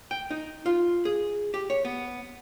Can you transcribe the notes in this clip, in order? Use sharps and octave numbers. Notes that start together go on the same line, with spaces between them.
G5
D#4
F4
G#4
G4
C#5
B3